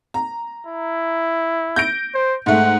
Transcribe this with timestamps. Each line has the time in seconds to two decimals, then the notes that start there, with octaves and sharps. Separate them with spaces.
0.14 A#5
0.66 E4
1.76 G6 A#6 D7
2.14 C5
2.46 G#2 A3 F#5